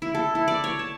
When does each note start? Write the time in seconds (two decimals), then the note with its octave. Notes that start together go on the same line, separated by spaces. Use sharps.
0.02 E4
0.15 A4
0.35 E4
0.48 D5
0.64 C#5
0.79 A5